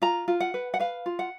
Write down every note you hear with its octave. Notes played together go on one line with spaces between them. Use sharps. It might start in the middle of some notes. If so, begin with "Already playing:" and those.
F4 A#5
F4
F#5
B4
F#5
B4 F5
F4
F#5